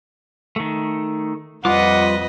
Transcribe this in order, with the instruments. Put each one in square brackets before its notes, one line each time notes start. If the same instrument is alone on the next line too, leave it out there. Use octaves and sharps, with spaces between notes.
[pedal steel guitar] D#3 A3
[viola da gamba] F2 B4 D#5 [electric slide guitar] G3 F4 [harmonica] F#5 [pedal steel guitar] D6